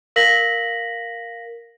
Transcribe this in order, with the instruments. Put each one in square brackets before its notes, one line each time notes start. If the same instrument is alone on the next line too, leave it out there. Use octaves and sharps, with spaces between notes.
[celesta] A#4 F5 A#6 B6 F#7